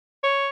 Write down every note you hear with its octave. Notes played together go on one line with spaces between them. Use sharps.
C#5